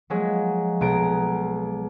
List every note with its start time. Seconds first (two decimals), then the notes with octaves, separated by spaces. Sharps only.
0.10 F3 F#3 G#3 A#3
0.81 B1 B3 G#4 A#5 D7